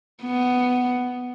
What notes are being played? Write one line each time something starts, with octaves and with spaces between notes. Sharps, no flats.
B3